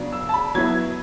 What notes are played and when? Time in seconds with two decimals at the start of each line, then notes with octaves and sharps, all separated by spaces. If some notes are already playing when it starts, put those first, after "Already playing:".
Already playing: C#3 F#3 B3 D4
0.13 E6
0.29 A5
0.34 B5
0.54 F#3 B3 E4 G#6